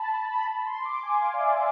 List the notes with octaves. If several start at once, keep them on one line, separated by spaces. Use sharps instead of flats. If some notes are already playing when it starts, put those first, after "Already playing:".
Already playing: A5 B5
A5
B5
B5
C6
D6
G#5
F5
D5
E5